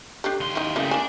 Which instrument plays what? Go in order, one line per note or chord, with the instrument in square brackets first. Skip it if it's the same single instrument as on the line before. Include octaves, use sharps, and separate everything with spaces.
[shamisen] D4 G4 A4
[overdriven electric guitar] D#2 C6
[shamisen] D#4 E4
[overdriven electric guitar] C#3 G3 [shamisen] A#3 E4 A4
[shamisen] A#3 G#5 [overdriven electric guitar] D4